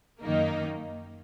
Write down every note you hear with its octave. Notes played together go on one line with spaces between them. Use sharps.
F#2 D#3 A#3 D#4